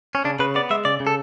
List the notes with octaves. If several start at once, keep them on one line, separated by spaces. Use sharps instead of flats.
C#4
C#3 D4
C#3 B4
B3 D5
G#3 E5
C#3 D5
C#3
A4